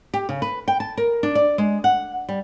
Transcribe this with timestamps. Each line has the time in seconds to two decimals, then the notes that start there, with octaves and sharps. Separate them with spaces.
0.14 G4
0.29 C#3
0.42 B4
0.68 G5
0.80 A5
0.97 A#4
1.23 D4
1.35 D5
1.58 G#3
1.84 F#5
2.29 G3